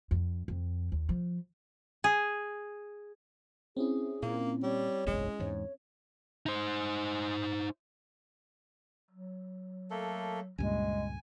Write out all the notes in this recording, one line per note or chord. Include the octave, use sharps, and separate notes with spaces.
F2
F2
D#2
F3
G#4
C4 C#4 E4 G#4
A#2 A#3
G3 C#5
F#1 B1 E2 G#3
E2 G#2 C#5
D#4 C5
F#3
A3 A#3 A4
C#2 G2 A#2 G#3 G#5